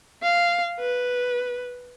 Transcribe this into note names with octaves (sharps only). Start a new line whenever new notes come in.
F5
B4